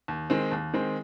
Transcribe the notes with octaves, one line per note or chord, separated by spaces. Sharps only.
D#2
D#3 G#3 C4
D#2
D#3 G#3 C4